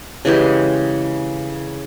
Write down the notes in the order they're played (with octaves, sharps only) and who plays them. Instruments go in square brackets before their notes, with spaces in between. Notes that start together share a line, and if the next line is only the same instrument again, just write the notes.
[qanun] C#3 E3 G#3 G4